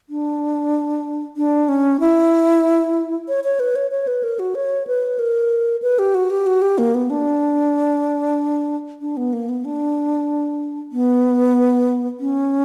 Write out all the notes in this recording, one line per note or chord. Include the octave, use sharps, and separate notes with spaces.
D4
D4
C#4
E4
C#5
C#5
B4
C#5
C#5
B4
A#4
F#4
C#5
B4
A#4
B4
G4
F#4
G4
F#4
G4
A#3
B3
D4
D4
B3
A#3
B3
D4
B3
C#4